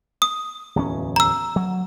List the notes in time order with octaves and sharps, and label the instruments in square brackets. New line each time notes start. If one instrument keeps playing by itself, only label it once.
[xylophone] D#6
[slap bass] D1 E2 C#4
[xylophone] A#5 E6
[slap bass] F#3